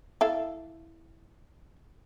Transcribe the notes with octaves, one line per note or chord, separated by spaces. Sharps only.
E4 A4 F5